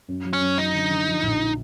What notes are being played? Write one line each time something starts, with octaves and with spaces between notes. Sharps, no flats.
F#2
F#3
C#4
F#2
F#3 D#4
D3
D3
F3
A#1